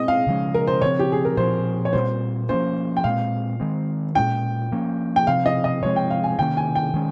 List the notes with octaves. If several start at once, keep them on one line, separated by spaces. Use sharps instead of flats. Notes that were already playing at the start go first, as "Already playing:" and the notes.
Already playing: G#3 C4 D#5
F5
C#3 F3 G#3 C#4
A#4
C5
C#3 F3 C4 C#5
G4
G#4
A#4
A#2 F3 C4 C5
C#5
A#2 G3 C4 C5
F3 A#3 C#4 C5
G5
A#2 G#3 C4 F5
D#3 G#3 C4
A#2 G#3 C#4 G5
F3 A#3 C#4
G5
C3 F3 C4 F5
D#5
D#5
C3 F3 G#3 C4 C#5
G5
F5
G#5
C3 D#3 A#3 C#4 G5
G#5
G5
D#3 G#3 C#4